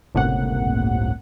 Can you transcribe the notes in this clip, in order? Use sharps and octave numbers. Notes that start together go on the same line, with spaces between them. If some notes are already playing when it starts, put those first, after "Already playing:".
G1 C#2 A2 C3 A#3 F#5